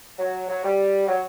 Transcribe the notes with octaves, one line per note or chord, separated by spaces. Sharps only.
F#3
F#3
G3
F#3